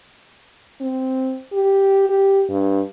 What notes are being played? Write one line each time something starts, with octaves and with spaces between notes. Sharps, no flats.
C4
G4
G4
G2